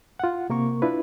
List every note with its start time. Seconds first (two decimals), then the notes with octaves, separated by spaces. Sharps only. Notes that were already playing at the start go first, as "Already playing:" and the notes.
0.20 F4 F#5
0.50 C3 A#3 A#4 C#6
0.82 D4 E4 F4 B4